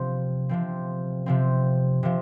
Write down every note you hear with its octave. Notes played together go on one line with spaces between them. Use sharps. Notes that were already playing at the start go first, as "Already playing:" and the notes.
Already playing: C3 F3 C4
C3 F3 C4
C3 F3 C4
C3 F3